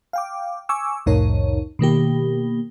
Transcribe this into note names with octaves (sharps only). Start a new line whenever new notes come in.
F5 G5 D6
G#5 C#6 D6 E6
C2 F2 A2 D#4 A#4 C#5
B2 D#3 A#3 G4